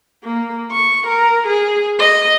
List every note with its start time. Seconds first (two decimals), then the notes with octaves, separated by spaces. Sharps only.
0.23 A#3
0.72 C#6
1.07 A#4
1.47 G#4
1.99 D#5